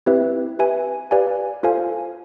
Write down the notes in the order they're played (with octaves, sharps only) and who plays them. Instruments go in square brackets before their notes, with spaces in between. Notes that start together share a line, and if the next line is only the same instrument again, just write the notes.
[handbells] C4 E4 G4 B4 E5
G4 B4 E5 G#5
G4 B4 D5 F5 G#5
F4 A4 C5 F5 G#5